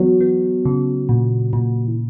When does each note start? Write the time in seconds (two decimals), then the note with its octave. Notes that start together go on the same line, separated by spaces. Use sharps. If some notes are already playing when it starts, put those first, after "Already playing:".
Already playing: E3 F#3 B3
0.20 B3
0.65 C#3
1.09 A#2
1.53 A#2
1.87 E3